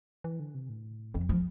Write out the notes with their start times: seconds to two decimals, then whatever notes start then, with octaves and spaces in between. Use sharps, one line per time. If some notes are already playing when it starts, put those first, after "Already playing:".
0.24 E3
0.40 D3
0.55 C3
0.69 A2
1.14 F2 F3
1.29 F3